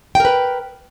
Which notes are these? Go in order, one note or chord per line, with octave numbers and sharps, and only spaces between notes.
A#4 B4 G5